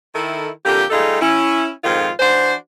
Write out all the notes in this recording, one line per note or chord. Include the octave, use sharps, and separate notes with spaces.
D#3 E4 A4
F2 D3 A#3 G4
G3 A3 D#4 F4 G#4 A4
C#4 E4
F2 G#2 D#3 F4
E3 D4 F#4 C5